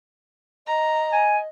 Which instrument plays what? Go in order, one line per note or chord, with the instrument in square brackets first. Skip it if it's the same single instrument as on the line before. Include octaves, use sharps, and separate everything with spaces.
[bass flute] D#5 [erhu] A#5
[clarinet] G#5